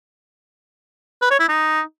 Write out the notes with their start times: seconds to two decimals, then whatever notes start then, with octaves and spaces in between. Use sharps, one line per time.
1.22 B4
1.31 C#5
1.40 E4
1.49 D#4